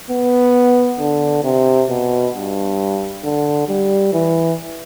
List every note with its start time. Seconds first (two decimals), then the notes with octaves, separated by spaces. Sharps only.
0.10 B3
1.00 D3
1.44 C3
1.89 B2
2.35 G2
3.24 D3
3.68 G3
4.13 E3